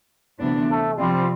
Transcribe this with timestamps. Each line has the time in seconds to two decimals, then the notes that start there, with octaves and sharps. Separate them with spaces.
0.39 D2 C3 E3 B3 D4
0.69 A3
0.98 C3 F3 G3 C4 F4